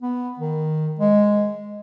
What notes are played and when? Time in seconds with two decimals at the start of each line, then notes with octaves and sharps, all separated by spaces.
0.02 B3
0.39 D#3
0.99 G#3